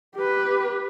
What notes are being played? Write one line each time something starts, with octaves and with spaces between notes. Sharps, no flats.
G4 B4